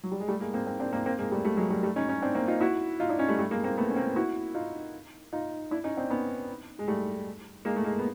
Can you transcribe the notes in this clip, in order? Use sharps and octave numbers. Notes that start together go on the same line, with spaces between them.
F#3
G3
G#3
G3 A3
G#3 A#3
A#3 C4
A#3 C4
C4 D4
A#3 C4
A#3 C4
G#3 A#3
G3 A3
G3 A3
F#3 G#3
G3 A3
G3 A3
C#4 D#4
C#4 D#4
C4 D4
A#3 C4
D#4 F4
E4 F#4
D#4 F4
D4 E4
C#4 D#4
G3 A3
G3 A3
G#3 A#3
A#3 C4
A3 B3
C#4
A#3 C4
E4 F#4
D#4 F4
D#4 F4
D4 E4
C#4 D#4
C4 D4
B3 C#4
G#3
G3 A3
G#3 A#3
A3
G#3 A#3
B3